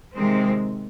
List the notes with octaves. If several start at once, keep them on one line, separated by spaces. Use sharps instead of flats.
C3 D#3 G#3 C4